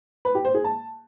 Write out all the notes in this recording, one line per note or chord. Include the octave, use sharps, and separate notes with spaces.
B4
G4
C5
G#4
A5